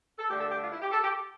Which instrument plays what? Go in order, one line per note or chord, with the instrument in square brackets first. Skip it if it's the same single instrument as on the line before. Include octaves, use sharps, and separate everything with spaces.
[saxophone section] A4
G2 D3 A3 G4
A4
G4
F4
E4
G4
A4
G4